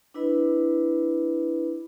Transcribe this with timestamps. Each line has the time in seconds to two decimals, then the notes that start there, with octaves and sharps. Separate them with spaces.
0.14 D4 E4 B4 D#5 B5